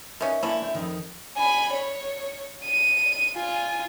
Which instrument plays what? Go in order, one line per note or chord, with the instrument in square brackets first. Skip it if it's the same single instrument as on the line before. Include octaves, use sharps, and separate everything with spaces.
[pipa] D#3 C#4 [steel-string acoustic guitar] B4 C5 [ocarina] E5
[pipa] D3 C#4 E4 [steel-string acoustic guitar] A#3
[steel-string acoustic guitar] A3 C5 C#5
F2 D#3
[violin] G#5 B5
C#5
D#7
F4 G#5